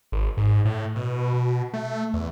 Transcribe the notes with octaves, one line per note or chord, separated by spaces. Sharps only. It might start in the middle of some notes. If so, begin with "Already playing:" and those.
G#1
G#2
A2
B2
B2
A3
E2